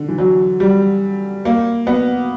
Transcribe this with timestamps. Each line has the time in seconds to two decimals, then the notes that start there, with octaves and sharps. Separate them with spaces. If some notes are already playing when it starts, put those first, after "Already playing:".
Already playing: D3
0.08 E3
0.18 F#3
0.60 G3
1.45 A#3
1.87 B3